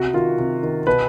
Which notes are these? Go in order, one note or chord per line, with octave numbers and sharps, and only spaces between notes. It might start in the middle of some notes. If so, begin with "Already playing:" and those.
Already playing: C3 F#4
D#3 F4
C3
D#3
B2 B4